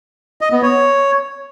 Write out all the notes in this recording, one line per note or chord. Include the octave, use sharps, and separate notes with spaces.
D#5
B3
C#5